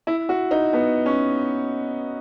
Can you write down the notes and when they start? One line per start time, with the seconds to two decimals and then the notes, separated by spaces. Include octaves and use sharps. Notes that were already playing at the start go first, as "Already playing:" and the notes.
0.07 E4
0.29 F#4
0.51 D#4
0.73 B3
1.06 C#4